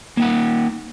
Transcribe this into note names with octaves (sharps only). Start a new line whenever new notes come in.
A#3 D#4 F#5